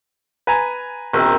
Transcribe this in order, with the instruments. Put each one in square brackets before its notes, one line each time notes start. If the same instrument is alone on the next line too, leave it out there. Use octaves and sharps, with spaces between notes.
[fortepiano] B4 G#5 A#5
[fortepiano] A#1 [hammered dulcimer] B2 D#3 C4